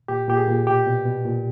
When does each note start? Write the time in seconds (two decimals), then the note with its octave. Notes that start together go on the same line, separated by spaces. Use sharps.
0.08 A#2 G4
0.28 A#2 G4
0.37 G#4
0.48 A#2
0.67 B2 G4
0.86 B2
1.06 B2
1.25 A#2